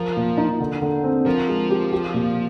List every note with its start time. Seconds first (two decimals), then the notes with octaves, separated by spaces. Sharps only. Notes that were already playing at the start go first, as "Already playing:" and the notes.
Already playing: F3 A#4
0.17 A#2
0.37 D#4
0.60 D3
0.82 D3
1.04 C4
1.26 F3 A#4
1.49 G#3
1.71 G4
1.92 G4
2.14 A#2